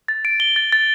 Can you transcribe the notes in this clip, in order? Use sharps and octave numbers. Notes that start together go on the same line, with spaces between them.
A6
D7
G7
A6
A6